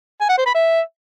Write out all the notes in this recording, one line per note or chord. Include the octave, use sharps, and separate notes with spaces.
G#5
F#5
C5
B5
E5